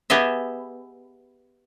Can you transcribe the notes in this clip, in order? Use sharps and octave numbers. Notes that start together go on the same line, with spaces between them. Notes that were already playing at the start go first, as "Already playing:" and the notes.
B3 G4 G#4 D#5 E5